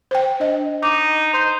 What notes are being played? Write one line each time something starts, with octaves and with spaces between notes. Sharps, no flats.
C5 G5
D4 D#5
D#4 D6
C5